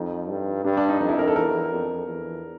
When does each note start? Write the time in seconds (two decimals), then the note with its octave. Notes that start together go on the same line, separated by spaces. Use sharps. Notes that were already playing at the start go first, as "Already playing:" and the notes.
Already playing: F2 D#4
0.29 G2
0.64 G2 D4
0.77 D4
0.89 D#4
1.01 F2 D#4
1.09 E4
1.19 A#4
1.28 A4
1.36 E2 A#4
1.72 F2
2.08 E2